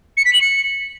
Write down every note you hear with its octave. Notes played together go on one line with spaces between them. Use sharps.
C#7
B6
F#7
C#7